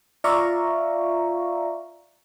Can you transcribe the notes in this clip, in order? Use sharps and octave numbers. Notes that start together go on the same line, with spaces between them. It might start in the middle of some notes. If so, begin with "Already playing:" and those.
F4 D5 E5 F5 A#5 C#6